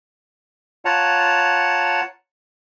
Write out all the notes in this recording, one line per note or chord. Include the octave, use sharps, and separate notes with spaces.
F4 C#5 F#5 A5 A#5